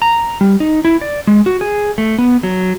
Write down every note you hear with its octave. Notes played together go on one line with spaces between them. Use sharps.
A#5
G3
D#4
E4
D5
G#3
F#4
G#4
A3
B3
F#3